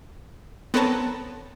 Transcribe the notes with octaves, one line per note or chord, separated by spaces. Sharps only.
B3 C4 A4 C#5 A5 A#5